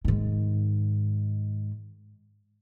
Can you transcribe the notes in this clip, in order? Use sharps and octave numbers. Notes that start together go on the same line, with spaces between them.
G#2 D#3